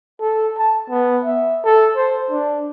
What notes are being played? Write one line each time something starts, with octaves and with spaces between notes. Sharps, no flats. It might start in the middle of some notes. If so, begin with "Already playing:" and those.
A4
A5
B3
E5
A4
C5
D4